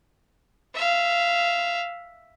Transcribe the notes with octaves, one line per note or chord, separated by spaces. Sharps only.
E5 F5